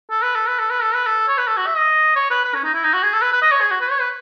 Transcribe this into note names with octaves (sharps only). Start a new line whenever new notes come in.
A4
B4
A4
B4
A4
B4
A4
B4
A4
C#5
B4
A4
F#4
E5
D#5
C#5
B4
B4
C#4
D#4
E4
D#4
F#4
G#4
A4
B4
B4
D#5
C#5
G#4
F#4
B4
C#5
B4